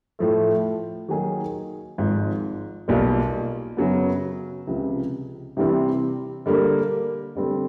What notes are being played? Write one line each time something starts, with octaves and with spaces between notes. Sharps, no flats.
A2 F3 A3
D#3 F#3 A#3 D#4 G#4
G#1 G#2 F3
B1 A#2 G3
F#2 C#3 F#3 B3
C#2 C3 F3
C3 E3 G3 C4
D3 G3 A#3
D3 G3 C4